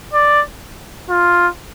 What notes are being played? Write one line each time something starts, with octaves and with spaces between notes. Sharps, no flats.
D5
F4